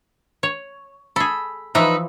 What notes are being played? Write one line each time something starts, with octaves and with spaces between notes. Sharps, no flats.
C#5
G#4 A4 B5
E3 F3 D#4 B4 E5